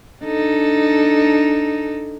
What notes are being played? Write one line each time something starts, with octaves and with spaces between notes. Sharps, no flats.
D4 D#4 A4